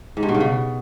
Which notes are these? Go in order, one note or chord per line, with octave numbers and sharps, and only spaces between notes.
G#2
G2
B2
C#3
B2